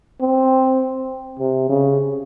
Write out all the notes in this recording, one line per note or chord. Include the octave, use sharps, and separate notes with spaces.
C4
C3
C#3